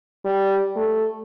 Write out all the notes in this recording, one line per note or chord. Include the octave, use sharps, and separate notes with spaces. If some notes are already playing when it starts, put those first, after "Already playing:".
G3
A3